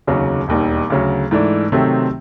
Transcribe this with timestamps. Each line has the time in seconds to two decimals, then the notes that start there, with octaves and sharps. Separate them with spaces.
0.07 F1 D#2 C#3 F#3
0.48 E1 D#2 D#3 G3
0.90 D2 C#3 F#3
1.31 G#2 E3 A3 D4
1.72 C3 D#3 F#3 A3 C4